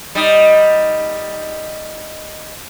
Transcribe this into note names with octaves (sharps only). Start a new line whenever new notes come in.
G3 D#4